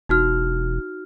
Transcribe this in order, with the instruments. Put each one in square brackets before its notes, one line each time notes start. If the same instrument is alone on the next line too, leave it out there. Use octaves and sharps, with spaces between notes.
[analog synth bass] E1 [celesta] D#4 F#4 F6